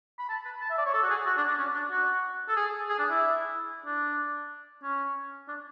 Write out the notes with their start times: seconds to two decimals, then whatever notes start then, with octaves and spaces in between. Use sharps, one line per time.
0.19 B5
0.29 A5
0.45 B5
0.61 A5
0.70 E5
0.78 D5
0.86 C#5
0.94 A4
1.03 F#4
1.10 G#4
1.26 F#4
1.37 D4
1.48 D4
1.59 C#4
1.75 D4
1.91 F#4
2.48 A4
2.56 G#4
2.89 G#4
2.99 D4
3.10 E4
3.86 D4
4.83 C#4
5.48 D4